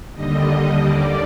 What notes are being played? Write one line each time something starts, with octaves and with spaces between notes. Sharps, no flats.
D#2 D3 G3 D#5
D5